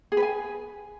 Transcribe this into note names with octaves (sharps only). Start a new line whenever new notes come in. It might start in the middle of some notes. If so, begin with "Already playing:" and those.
G#4
B4
G#5